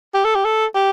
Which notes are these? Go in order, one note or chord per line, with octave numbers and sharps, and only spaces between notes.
G4
A4
G4
A4
G4